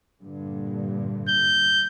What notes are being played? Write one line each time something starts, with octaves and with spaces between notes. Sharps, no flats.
G2 A#2 D3
G6